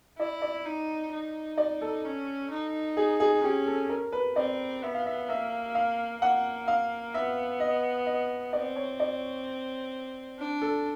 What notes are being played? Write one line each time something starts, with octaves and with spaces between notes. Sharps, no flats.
E4 D5
D5
D#4
D#4
D5
A4
C#4
D#4
G#4
G#4
C#4 G4
A4
A#4
B4
C4 D5
B3 E5
F5
E5
A#3 E5
F5
A#3 F#5
F5
B3 E5
D#5
D#5
C4 D5
C#5
D5
D4
A4